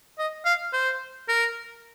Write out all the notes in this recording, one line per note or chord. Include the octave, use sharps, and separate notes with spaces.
D#5
F5
C5
A#4